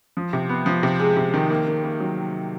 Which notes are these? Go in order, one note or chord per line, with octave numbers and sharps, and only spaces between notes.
F3
C3
B3
F3
C3
G#3
C3
D#3
A#3
A#3
A#3
F#3